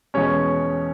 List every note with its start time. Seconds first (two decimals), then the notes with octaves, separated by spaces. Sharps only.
0.14 E2 B2 G#3 C#4 C#5